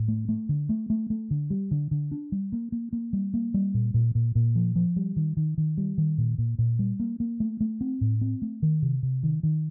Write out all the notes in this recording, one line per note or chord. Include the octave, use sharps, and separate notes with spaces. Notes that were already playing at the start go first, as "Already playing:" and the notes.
Already playing: A2
A3
A3
D3
A3
A3
A3
D3
G3
D3
D3
D4
G3
A#3
A#3
A#3
G3
A#3
G3
A#2
A#2
A#2
A#2
F3
F3
G3
D#3
D#3
D#3
G3
D#3
A#2
A#2
A#2
G3
A#3
A#3
A3
A3
C4
A2
C4
A3
D#3
C3
C3
D#3
D#3